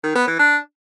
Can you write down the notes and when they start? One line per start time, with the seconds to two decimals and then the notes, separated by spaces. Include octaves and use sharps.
0.04 D#3
0.16 B3
0.27 E3
0.39 D4